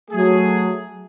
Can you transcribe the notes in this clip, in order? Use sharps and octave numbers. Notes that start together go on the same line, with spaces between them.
F#3 A3 G#4